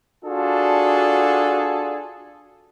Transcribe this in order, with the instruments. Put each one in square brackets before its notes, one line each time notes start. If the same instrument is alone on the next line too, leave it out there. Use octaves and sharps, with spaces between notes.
[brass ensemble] D4 F4 F#4 G#4 A4